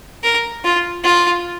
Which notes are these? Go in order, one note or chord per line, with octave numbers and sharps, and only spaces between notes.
A#4
F4
F4